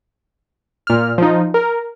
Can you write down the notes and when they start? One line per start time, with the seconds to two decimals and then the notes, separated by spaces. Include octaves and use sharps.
0.87 A#2 F6
1.18 F3 D#4
1.54 A#4